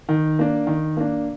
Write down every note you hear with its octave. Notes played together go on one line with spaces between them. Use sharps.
D#3
A#3 D4
D#3
A#3 D4